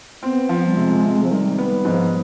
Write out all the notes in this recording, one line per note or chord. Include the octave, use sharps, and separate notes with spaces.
B3 C4
F3
G3
C3 G#3
C3
F3
D#3 G3
B3
G#2 F3